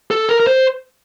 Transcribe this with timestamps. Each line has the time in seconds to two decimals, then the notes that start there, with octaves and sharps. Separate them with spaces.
0.11 A4
0.29 A#4
0.40 A#4
0.47 C5